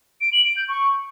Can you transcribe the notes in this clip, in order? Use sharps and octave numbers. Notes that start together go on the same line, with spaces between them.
D7
F#7
D7
G6
C#6